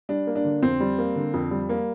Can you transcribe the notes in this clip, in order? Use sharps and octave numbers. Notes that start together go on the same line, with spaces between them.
G3 D4
A#3
D4
D3
F2 C4
G3
A#3
D3
F2
G3
A#3